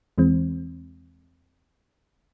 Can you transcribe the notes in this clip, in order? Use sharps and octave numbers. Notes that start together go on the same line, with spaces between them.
E2 E3 G#3 C4